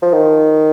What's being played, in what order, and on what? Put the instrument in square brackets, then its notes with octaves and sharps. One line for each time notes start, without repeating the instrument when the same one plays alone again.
[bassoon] F3
D#3